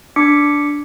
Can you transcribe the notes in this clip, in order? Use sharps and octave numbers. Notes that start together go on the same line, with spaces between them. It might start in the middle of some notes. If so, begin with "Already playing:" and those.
D4 D6 B6 C#7